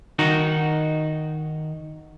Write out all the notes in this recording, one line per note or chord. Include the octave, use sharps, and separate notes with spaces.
D#3 D#4 F#4